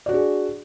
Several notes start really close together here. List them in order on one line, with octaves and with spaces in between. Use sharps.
D5 F#4 D4 G#4